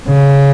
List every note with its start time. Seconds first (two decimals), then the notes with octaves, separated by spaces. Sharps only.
0.08 C#3